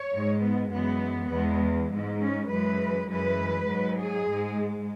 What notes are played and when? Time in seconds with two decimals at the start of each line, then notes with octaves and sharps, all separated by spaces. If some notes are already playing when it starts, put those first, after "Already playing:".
Already playing: C#5
0.12 G#2 G#3
0.42 B3
0.71 F#2 E3 G#3 B3
1.31 E2 E3 G#3 B3
1.90 G#2 G#3
2.20 C#4
2.50 F#2 E3 G#3 B4
3.09 F#2 E3 G#3 B4
3.68 G#2 F#3
3.98 G#4
4.28 G#2 G#3